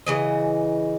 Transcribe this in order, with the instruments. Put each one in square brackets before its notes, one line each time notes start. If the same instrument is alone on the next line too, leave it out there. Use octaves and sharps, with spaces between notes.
[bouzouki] C#3 E3 D#5